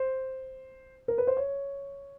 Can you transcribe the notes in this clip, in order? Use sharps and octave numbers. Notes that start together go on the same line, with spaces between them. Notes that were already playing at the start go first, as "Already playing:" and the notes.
Already playing: C5
A#4
B4
C5
C#5